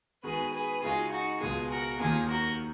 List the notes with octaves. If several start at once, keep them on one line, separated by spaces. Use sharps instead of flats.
D#3 G#3 B3 F#4 G#4 B4
G#4 B4
C#3 G#3 D#4 F4 F#4 G#4
D#4 F#4
C#2 B2 G#3 F4 G#4
F#4 A#4
D#2 D#3 A#3 F4 G#4
F#4 A#4